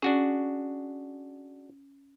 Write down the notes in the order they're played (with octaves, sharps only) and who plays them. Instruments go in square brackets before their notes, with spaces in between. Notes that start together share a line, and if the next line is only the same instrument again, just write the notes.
[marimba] C#4 [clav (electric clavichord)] D4 F#4 G#4